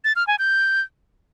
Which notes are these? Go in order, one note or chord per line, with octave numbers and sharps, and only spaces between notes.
A6
F6
G#5
G6